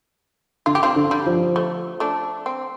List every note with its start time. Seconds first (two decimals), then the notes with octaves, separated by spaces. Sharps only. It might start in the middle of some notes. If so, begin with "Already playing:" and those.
0.66 D3 F4
0.75 G4
0.83 C4 F4
0.96 D3
1.11 G3
1.26 F3
1.56 A3
2.00 A3 D4
2.46 C4